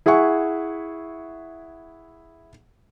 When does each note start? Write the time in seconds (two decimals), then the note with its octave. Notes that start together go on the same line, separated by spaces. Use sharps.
0.06 E4 G#4 E5 F#5 C#6